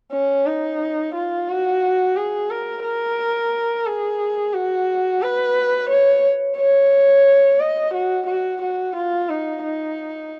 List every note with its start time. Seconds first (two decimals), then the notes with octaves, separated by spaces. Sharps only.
0.13 C#4
0.47 D#4
1.15 F4
1.49 F#4
2.16 G#4
2.50 A#4
2.84 A#4
3.86 G#4
4.54 F#4
5.22 B4
5.90 C#5
6.57 C#5
7.59 D#5
7.94 F#4
8.27 F#4
8.62 F#4
8.96 F4
9.29 D#4
9.63 D#4